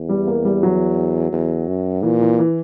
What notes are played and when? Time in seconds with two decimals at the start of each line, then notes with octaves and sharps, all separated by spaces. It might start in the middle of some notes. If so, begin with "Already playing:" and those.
Already playing: E2
0.09 G3
0.27 A#3
0.45 G3
0.63 F#3
1.33 E2
1.68 F#2
2.03 A#2 E3
2.21 E3
2.39 E3